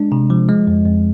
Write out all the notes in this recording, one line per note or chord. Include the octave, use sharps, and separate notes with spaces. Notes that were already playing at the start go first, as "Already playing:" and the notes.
Already playing: G#3 D4
C3
F3
G#3
F2
F2